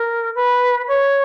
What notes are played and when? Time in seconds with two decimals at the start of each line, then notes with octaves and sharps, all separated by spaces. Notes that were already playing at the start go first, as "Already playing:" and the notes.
Already playing: A#4
0.35 B4
0.88 C#5